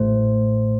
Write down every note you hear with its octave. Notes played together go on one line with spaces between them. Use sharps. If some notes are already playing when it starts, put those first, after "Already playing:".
Already playing: A1 A2 A3 C5